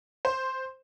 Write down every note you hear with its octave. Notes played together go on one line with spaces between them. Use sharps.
C5